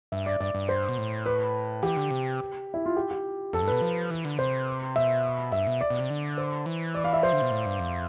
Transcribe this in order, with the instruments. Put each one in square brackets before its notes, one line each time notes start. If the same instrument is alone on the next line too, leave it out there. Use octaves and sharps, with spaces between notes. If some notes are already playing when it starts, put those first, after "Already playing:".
[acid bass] G2 [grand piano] E5
[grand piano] D5
[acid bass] G2 [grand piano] D5
[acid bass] G2
[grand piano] C5
[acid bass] B2
A2
[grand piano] B4
[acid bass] E3 [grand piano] G4
[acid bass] D3
C3
[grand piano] E4
F4
G4
G4
[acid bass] F2 [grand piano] A4
[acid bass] G2
[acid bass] B2 [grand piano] B4
[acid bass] F3
E3
D3
[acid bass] C3 [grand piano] C5
[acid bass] B2 [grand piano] E5
[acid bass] G2 [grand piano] E5
[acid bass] B2
[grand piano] D5
[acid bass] B2
C3
D3
[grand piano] C5
[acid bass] E3
[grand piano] D5
F5
E5
[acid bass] F3 [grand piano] C5
[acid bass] D3
B2
A2
G2
F2